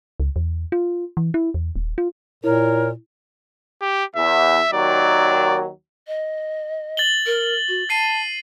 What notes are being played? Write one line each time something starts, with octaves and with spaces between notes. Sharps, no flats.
C#2
E2
F4
E3
E4
E2
D#1
F4
A#2 E4 A#4 C#5
G4
E2 E5
D#2 D#3 F#3 D5
D#5
A6 F#7 G7
A#4
F#4
A5 A6 C7 D#7